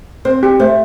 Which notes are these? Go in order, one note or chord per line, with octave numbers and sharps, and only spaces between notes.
C4 C5
G4
A3 C5